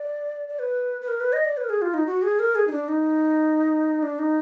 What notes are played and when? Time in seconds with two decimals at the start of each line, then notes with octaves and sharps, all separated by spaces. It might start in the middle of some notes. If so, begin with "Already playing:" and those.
Already playing: D5
0.48 D5
0.59 B4
1.02 B4
1.08 A#4
1.20 B4
1.33 D#5
1.45 D5
1.57 B4
1.64 A#4
1.69 G#4
1.82 F4
1.94 D#4
2.06 F#4
2.23 G#4
2.39 A#4
2.55 G#4
2.68 D#4
2.72 D4
2.88 D#4
4.03 D4
4.19 D#4